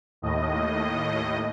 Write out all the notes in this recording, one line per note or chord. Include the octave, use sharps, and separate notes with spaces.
D#2 A2 D#5